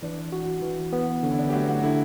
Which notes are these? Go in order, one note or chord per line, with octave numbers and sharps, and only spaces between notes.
E3 D4
F#4
E3
B3
D3 C#4
E4
D4
G4
F#3 A3 F#4
F#3 F#4
D3 E3 E4